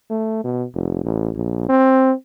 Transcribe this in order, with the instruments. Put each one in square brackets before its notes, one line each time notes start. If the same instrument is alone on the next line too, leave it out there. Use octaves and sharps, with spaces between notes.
[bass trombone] A3
B2
F1
A1
A#1
C4